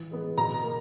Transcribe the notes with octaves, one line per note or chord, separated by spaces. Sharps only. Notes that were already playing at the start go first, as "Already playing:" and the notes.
Already playing: E3
G#3 B3
B2 A#5
A#3